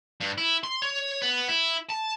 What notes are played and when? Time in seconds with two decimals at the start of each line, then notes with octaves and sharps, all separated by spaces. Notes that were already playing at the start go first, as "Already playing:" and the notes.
0.21 G2
0.38 E4
0.64 C6
0.82 C#5
1.22 B3
1.48 E4
1.90 A5